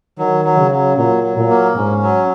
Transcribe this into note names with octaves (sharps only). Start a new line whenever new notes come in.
D#3 F#3
F#3
C#3
F#3
A#2 F#3
F#3
A#2
A#3
G#2 C#4
F#3